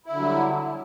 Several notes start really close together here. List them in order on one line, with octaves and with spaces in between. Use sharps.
E4 D3 F#3 G3